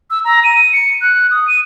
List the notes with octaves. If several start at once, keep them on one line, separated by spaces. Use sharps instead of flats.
E6
A#5
D#7
C#7
F#6
D#6
D#7